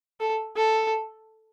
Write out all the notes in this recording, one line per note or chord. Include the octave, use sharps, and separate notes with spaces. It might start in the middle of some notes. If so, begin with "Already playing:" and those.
A4
A4